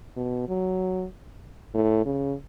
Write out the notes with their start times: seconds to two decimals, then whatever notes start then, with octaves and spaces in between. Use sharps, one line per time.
0.17 B2
0.48 F#3
1.74 A2
2.06 C#3